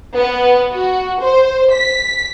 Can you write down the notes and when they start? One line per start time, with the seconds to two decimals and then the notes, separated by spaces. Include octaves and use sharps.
0.16 B3
0.72 F#4
1.20 C5
1.72 B6